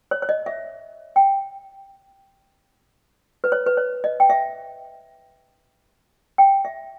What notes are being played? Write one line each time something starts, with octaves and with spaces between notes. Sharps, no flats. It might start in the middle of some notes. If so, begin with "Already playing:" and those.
C#5
C#5
D#5
E5
G5
B4
C#5
B4
C#5
D#5
G5
E5
G5
E5